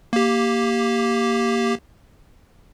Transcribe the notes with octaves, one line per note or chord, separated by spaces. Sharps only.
A#3 G4